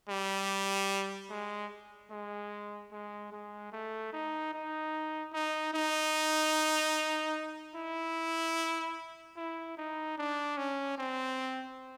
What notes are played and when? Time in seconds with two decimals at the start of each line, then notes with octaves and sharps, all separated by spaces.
0.09 G3
1.30 G#3
2.11 G#3
2.92 G#3
3.32 G#3
3.73 A3
4.13 D#4
4.53 D#4
5.33 D#4
5.74 D#4
7.75 E4
9.37 E4
9.78 D#4
10.18 D4
10.58 C#4
10.98 C4